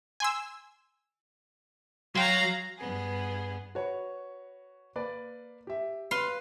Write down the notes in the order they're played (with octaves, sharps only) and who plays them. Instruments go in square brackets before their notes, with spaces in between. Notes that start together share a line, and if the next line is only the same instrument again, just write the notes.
[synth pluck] G#5 C6 E6
[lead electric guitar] F#3 [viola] F5 A#5 [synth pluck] G5 C6
[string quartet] G2 B3 G#4
[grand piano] F#4 B4 C#5
A#3 B4 D5
G4 E5
[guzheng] B4 F5 C6